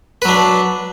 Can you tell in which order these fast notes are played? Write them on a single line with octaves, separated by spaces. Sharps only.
B4 F#3 D4